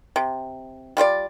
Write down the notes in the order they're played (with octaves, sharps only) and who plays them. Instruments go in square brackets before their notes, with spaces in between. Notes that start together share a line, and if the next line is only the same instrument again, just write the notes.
[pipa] C3
G3 F4 C5 D5